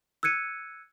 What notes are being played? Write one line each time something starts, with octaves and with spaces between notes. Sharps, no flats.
E6 F#6 G#6 C#7 D#7